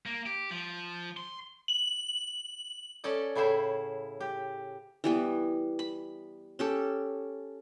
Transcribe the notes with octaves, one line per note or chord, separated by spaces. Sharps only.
A#3
G4
F3
C6
F#7
C#4 A4 D5 D#5
A2 C#3 E4 C5 E5
G4
E3 G3 B3
B5
C#4 G4 A4